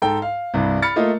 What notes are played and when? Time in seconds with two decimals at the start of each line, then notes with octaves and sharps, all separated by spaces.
0.02 G#2 A4 G5
0.22 F5
0.54 C2 G2
0.82 B5 F6 A6 C#7
0.96 A3 A#3 F4 D#5